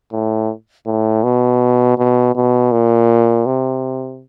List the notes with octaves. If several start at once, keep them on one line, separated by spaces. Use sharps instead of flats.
A2
A2
B2
B2
B2
A#2
C3